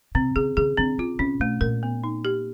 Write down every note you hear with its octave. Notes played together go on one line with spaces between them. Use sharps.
C3 C4
C#3 G#4
C#3 G#4
D3 C4
C#3 F4
C3 C#4
B2 A3
A#2 A#4
B3
D#4
G4